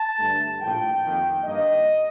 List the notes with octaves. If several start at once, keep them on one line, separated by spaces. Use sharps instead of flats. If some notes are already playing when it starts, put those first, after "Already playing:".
Already playing: A5
G2 D3 A3
A#1 A2 F3 A3 G5
F2 D#3 A#3
G2 D#3 A#3 D#5